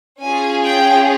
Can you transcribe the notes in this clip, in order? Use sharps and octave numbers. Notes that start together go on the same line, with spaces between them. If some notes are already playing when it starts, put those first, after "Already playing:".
C#4 F4 G#4 G#5
G5